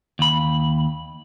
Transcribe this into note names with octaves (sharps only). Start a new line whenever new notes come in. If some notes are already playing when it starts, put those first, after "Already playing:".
D#2 B5